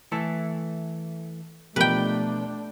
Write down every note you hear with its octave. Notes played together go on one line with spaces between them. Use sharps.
E3 A3 A4
B2 F3 A3 D4 G4 A#4 B4 G5